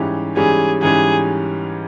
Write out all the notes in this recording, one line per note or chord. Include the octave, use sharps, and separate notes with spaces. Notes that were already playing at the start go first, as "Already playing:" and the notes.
Already playing: G#2 E3 G3 C#4 G4
G#2 E3 G3 C#4 G4 G#4
G#2 E3 G3 C#4 G4 G#4